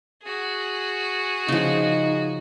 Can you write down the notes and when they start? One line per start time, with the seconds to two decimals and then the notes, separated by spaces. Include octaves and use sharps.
0.23 F#4 G#4
1.48 C#3 F3 D#4